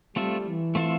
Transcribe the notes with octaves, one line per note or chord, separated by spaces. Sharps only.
G3 A3 C4 F4 A4 E5
E3
A3 C4 F4 A4 E5